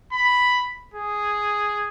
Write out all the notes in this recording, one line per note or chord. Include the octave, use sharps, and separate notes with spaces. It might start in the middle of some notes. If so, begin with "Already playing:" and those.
B5
G#4